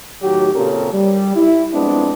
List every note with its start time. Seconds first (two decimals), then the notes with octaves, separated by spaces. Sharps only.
0.22 A2 D#3 F#3 F#4 G4
0.55 A#2 C#3 C4 C#4 A4 A#4
0.93 G3
1.36 E4
1.73 F2 G#3 B3 C4 D4